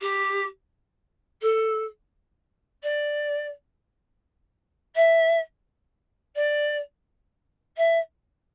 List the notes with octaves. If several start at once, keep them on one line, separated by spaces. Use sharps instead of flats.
G4
A4
D5
E5
D5
E5